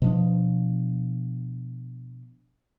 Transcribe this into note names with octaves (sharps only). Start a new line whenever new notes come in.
B2 F3 D4